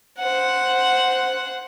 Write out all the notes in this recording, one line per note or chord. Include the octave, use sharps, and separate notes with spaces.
C5 F#5